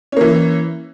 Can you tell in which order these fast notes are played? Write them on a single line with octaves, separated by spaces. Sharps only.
C#4 A#3 E3